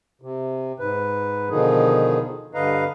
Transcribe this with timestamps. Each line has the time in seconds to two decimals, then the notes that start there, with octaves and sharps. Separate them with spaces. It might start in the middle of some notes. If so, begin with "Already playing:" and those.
0.22 C3
0.79 G#2 B4
1.50 B2 D3 D#3 F3 D#4 G#4
2.54 G2 D3 B4 D#5 F5 A#5